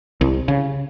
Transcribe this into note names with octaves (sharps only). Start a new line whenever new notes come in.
C2
C#3